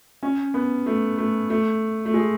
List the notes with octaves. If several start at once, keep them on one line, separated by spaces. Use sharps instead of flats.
C#4
B3
A3
A3
A3
A3
G#3